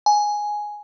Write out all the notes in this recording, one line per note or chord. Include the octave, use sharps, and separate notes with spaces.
G#5